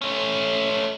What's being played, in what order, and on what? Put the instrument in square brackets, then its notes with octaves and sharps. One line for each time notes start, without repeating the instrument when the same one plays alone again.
[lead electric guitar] A3 C#4